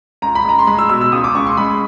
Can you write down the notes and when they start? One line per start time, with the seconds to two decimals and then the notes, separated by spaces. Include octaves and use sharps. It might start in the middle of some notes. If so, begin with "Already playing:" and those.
0.22 C#2 A#5
0.35 B5
0.45 G#3 A#5
0.59 C6
0.67 G#3 B5
0.79 E6
0.89 B2 E6
1.01 E6
1.12 C#2 D#6
1.24 D6
1.35 C#2 C#6
1.47 C6
1.57 G#3 B5